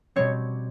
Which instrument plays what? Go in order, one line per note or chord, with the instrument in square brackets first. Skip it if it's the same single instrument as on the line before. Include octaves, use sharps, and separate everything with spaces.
[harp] B2 G3 C4 C#5